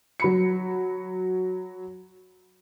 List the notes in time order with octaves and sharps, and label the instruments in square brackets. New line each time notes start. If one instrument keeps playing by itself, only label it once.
[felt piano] F#3 B5 C#7